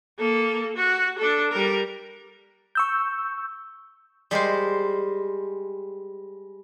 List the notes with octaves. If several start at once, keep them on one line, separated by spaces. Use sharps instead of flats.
A#3 A4
F#4
D4 A4
G3 A#4
C#6 E6 G6
G3 G#3 A#4 C5